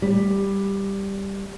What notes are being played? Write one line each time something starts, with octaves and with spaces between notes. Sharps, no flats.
G3